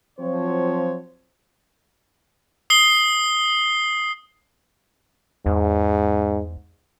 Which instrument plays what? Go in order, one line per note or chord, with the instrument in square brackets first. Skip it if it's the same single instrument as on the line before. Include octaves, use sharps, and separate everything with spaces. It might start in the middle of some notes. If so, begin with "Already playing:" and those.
[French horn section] F3 F#3 C4 [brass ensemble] C5 C#5
[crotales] D#6 C7 G7
[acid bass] E2 [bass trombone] G#2